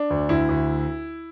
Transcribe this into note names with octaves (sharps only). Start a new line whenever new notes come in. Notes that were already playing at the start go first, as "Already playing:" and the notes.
Already playing: D4
D2
D2 E4
D2